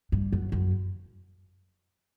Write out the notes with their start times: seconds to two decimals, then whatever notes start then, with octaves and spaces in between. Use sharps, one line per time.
0.12 G2
0.32 F#2
0.52 F#2